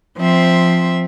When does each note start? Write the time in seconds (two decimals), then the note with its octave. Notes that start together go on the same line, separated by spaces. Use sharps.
0.17 F3 C4 E5